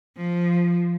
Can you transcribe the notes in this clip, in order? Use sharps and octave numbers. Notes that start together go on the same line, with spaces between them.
F3